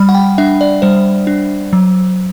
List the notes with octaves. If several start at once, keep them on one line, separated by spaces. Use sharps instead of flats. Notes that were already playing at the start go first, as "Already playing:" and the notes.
Already playing: G3 B5
F#5
G5
D4 E5
D5
G3 C5
D4
F#3